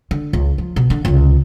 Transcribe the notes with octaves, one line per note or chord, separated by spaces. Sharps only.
D3
C#2
F3
B2
D3
C#2 C3